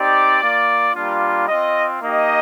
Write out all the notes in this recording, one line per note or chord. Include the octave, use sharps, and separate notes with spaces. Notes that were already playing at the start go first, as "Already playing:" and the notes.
Already playing: C4 D#4 G4 D5
A#3 F4
G3 A#3 D4 F4
C4 F4 D#5
A#3 D#4 G4 D#5